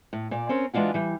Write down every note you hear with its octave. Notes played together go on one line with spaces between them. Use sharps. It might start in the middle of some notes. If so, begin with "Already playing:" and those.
A2
A#2 D5
C4 C#4 A#4
E3 G#3 D4 F4 F#4
E3 G3